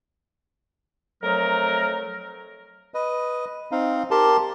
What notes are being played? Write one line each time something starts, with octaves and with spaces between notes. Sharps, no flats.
F2 F#3 A3 A#4
B4 D#5
C4 D#4 F5
G4 A#4 A5 C6